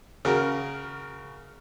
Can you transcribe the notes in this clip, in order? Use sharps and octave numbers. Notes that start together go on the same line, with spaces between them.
C#3 F#4 A#4